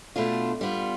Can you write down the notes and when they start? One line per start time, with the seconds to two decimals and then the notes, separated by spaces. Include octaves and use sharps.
0.16 B2 A3 D4 F4
0.61 G3 B3 F4